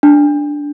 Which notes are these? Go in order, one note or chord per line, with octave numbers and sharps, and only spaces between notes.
D4